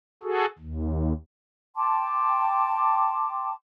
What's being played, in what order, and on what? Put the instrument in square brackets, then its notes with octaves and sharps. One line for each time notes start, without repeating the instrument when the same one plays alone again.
[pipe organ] F#4 G#4 A4
D#2
[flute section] G5 A5 C6 D6